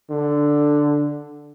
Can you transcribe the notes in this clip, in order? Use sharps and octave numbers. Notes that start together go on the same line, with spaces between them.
D3